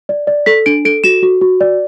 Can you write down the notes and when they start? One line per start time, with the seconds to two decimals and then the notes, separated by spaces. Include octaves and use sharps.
0.09 D5
0.27 D5
0.46 A4 B6
0.66 D4 D7
0.85 A4 D7
1.04 F#4 E7
1.23 F#4
1.41 F#4
1.61 D5